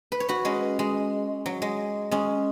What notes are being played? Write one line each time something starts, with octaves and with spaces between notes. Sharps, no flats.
B4
C#5
F#4 B4
G#3 C#4
G#3
F#3
G#3
G#3 C#4